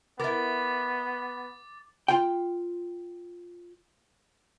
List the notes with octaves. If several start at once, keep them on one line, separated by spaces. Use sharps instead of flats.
B3 E4 A#4 D6 A6
F4 G5